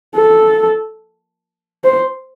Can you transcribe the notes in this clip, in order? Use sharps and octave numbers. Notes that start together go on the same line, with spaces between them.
A4
C5